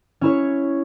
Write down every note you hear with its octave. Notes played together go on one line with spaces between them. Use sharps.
C#4 E4 C#5